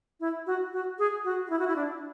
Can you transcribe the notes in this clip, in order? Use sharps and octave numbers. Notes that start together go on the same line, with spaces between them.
E4
F#4
F#4
G#4
F#4
F#4
E4
F#4
E4
D4